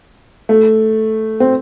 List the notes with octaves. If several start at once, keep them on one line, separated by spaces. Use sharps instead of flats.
A3
C4